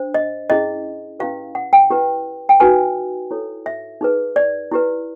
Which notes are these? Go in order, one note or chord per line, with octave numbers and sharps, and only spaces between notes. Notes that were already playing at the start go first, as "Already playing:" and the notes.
Already playing: D4 C5
D#5
C#4 E4 G#4 D#5
C#4 E4 G4 B4 F5
F#5
G5
E4 G4 B4
G5
D#4 F#4 B4 G#5
E4 A4 C#5
E5
D#4 G#4 B4
D5
E4 G4 B4